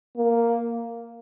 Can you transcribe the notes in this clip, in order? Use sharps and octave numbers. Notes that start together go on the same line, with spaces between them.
A#3